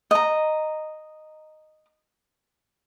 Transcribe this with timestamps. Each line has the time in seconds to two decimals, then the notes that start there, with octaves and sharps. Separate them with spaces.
0.11 D#5 A#5